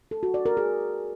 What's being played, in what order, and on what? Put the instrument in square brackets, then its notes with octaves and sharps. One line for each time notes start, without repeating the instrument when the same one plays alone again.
[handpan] A4
F#4
D5
A#4
G#4